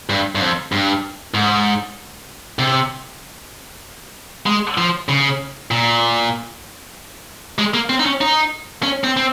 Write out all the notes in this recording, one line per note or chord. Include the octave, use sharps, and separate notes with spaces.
G2
G2
F2
G2
G#2
C3
G#3
F3
C#3
A#2
G#3
A#3
C4
D#4
C#4
D#4
C#4
C4
C4